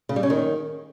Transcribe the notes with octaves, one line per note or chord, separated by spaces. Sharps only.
C#3
G3
C#4
D#3